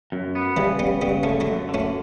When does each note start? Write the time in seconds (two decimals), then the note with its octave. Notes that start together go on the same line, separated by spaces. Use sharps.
0.12 F#2
0.35 B3
0.56 C#3 E3 G3
0.79 C#3 G3 B3
1.01 C#3 G3 B3
1.23 D3 A3 C#4
1.40 F#3 A3
1.47 F#2
1.69 D3
1.74 A3 C#4